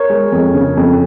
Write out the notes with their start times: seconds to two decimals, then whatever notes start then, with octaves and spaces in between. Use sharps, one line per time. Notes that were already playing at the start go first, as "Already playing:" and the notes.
Already playing: A#4 C#5
0.09 G#3
0.32 F2
0.54 C#3
0.77 F2